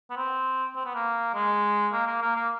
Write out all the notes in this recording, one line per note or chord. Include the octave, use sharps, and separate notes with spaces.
B3
C4
C4
B3
A#3
G#3
A#3
A#3
A#3
A#3